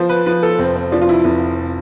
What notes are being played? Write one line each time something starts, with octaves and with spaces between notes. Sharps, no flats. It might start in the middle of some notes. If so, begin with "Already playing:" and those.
Already playing: F3 C5
B4
F3 B4
A4
F1 C4
C4
F3 D4
F4
E4
F1